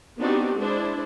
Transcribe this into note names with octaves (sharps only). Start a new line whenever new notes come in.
B3 C4 D4 D#4 F#4 G4
G#3 D4 E4 C5